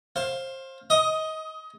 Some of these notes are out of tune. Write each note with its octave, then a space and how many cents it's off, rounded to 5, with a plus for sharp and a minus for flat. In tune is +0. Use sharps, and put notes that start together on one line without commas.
C5 +25 F5 +0
D#5 +25 D#6 +10